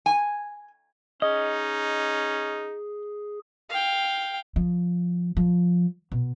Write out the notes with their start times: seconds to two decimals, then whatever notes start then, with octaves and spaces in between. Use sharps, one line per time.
0.06 G#5
1.22 C#4 D#4 G#4 D#5
3.70 F5 G5
4.56 F3
5.37 F3
6.12 B2